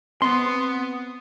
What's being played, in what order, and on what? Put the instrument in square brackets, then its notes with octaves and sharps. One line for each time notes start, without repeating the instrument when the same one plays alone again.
[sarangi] B3 [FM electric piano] C4 [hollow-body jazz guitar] C6